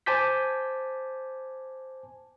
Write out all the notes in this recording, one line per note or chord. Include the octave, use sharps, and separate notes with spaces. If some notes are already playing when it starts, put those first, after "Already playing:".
C5 G#5 A5 D6 G6 B6